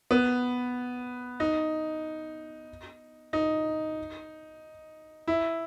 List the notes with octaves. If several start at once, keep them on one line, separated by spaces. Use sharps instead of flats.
B3
D#4
D#4
E4